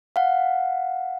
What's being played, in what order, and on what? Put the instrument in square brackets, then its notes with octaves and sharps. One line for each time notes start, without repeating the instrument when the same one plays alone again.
[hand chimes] F5 F#5